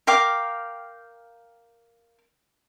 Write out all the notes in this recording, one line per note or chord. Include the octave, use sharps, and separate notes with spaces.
A#4 F5 G5 D6